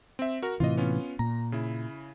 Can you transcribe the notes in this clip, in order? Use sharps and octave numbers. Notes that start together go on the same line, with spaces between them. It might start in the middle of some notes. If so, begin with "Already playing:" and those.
C4 E5
F#4 A#4
A2 C3 E3 F4 D#5
B3 C#4 F4
A#2 A#5
C#3 E4